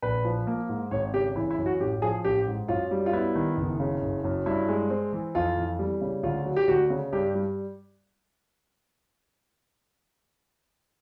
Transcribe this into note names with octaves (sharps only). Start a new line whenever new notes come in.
A#1 B4
F3
A#3
G#2
G#1 C#5
C#3 G4
E3 E4
E4
F#2
F#4
A1 G4
F3 G#4
A1 G4
G#2
F#2 F4
G3
F4
B3 E4
D#3
F#1
C#3
F#1
F#2
G2 E4
G#3
C4
E3
F2 F4
E3
G3
C#3
D2 F4
F#3
G4
D2 F#4
C#3
G2 G4
G3